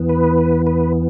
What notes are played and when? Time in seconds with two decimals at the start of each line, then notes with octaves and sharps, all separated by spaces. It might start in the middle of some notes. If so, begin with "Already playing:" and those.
Already playing: E2 E3 B3
0.09 B4
0.67 B4